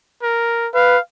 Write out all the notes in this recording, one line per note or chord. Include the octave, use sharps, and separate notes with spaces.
A#4
B4 F5